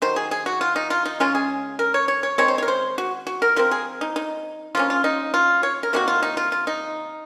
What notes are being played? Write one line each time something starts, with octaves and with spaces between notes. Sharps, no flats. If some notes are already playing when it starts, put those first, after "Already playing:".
D#3 F#3 C5
G#4
G#4
F#4
F4
D#4
F4
D#4
C#3 G#3 C#4 F4
G#4
A#4
C#5
C#5
C#5
D#3 G#3 C4 C#5
C5
C#5
A#4
C5
F#4
F#4
A#4
F3 C4 A#4
G#4
D#4
D#4
F3 A#3 C#4 F4
F4
D#4
F4
C#5
A#4
C3 D#3 A#3 C#4 F#4
F4
D#4
F4
F4
D#4